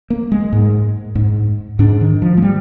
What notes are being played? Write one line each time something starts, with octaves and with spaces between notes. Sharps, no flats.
A#3
G#3
G#2
G#2
G#2 D4
D#3
F3
G#3
G3